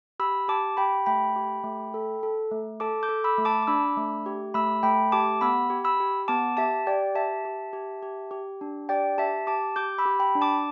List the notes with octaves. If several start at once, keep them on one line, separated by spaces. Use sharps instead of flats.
G4 B5 E6
G4 A5 D6
G4 G5 B5
A3 G5 B5
G4
A3
A4
A4
A3
A4 A5 D6
D6 G6
A4
B5 E6
A3
A5 D6
D6
D4 B5 E6
A3
G4
A3 B5 E6
A3 G5 B5
G4 A5 D6
B3 B5 E6
G4
B5 E6
G4
B3 A5 D6
G4 E5 A5
G4 D5 G5
G4 E5 A5
G4
G4
G4
G4
D4
G4 D5 G5
G4 E5 A5
G4 A5 D6
G4 D6 G6
B5 E6
G4
G5 B5
D4
A5 D6